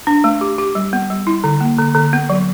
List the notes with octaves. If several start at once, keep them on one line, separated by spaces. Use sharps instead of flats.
D4
A3
G4
G4
G3
B3
G3
E4
D3
A#3
D3
D3
B3
F#3